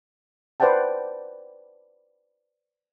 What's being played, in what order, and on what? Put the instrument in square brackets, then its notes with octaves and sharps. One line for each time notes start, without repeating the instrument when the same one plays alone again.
[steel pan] B4 C5 D5 F#5 G5 A5